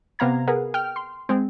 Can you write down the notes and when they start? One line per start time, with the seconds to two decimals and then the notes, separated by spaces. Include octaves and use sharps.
0.19 C3 B3 F5 A#5 G#6
0.48 G#4 A#4 B4 F#5
0.74 G5 F6
0.96 C6
1.29 G#3 C4